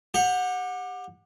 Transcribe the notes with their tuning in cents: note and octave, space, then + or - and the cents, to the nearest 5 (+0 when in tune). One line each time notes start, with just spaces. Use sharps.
G4 +20 F#5 -20